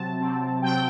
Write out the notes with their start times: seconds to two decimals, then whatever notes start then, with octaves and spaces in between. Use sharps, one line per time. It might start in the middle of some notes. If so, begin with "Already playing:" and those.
Already playing: C3 F#3 C4 A5
0.21 C3 F#3 C4
0.62 C3 F#3 C4 G5